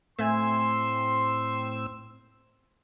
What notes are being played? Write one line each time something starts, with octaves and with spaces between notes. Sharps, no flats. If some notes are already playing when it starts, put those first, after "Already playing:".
A2 A3 C4 E5 G#5 C6 E6